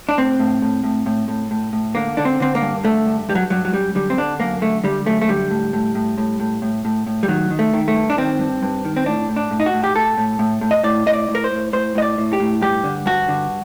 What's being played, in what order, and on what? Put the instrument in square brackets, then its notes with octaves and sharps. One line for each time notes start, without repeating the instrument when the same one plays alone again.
[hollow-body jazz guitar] D4
A2 C4
A2
A2
A2
A2
A2
A2
A2
D3 A#3
D3 D4
C4
D3 C4
A#3
G2
D3 A3
G2
G2 G3
F#3
G2 F#3
F#3
F#2 G3
D3 G3
C4
D3 D4
F#2 A#3
D3 A3
D3 G3
F#2 A3
A3
D3 G3
A2
A2
A2
A2
A2
A2
A2
A2
G3
D#3 F#3
D#3
A3
D#3
A3
G2
D4
D#3 C4
G2
G2
D#3
C4
A2 D4
A2
D4
A2
D#4
F#4
A2
G4
A2 A4
A2
A2
A2
D#5
A2 D5
A2 D#5
D5
A2
A#4
C5
A2
A2 C5
A2 D#5
D5
A2
G4
A2
G2 G4
D3
G2 F#4
D3